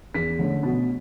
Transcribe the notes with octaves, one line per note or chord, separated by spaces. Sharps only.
E2 B6
D3 A3 C#4
B2